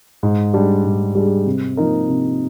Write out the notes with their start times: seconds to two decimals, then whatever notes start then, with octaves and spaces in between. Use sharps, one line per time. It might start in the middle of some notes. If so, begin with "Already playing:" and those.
0.23 G#2
0.54 G3 D4 G#4
0.85 G#2
1.15 G3 D4 G#4
1.46 C3
1.77 F3 A#3 D#4 A#4
2.08 C3